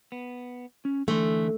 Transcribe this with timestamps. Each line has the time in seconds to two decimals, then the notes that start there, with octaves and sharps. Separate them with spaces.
0.12 B3
0.85 C#4
1.08 D3 E3 A3 C6